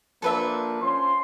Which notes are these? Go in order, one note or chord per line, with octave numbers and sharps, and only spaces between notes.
F3 A#3 D4 A4 B4 E5
C#4 F4 C5 C6